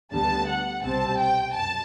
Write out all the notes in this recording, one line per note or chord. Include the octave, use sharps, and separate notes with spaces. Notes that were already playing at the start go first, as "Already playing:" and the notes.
D2 D3 G3 B3 A5
F#5
C2 B2 G3 C4 A5
G5
F#2 A5